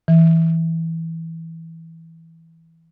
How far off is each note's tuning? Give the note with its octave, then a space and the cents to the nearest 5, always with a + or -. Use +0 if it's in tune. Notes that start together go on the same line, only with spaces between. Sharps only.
E3 -10